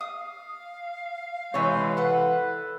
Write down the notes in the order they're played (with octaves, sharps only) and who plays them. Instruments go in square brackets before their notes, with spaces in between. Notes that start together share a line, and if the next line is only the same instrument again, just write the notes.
[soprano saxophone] F5 [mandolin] D#6
[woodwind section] C3 G#3 C4 [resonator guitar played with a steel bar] E3 C#5
[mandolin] A4 F#5 [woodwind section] B4